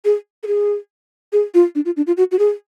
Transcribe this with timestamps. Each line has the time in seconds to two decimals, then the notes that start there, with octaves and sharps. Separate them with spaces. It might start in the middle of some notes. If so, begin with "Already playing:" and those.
0.05 G#4
0.43 A4
0.47 G#4
1.33 G#4
1.54 F4
1.75 D4
1.86 F4
1.97 D4
2.07 F4
2.17 F#4
2.32 F#4
2.39 G#4